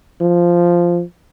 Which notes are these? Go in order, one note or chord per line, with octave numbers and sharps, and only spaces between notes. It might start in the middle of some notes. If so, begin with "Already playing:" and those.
F3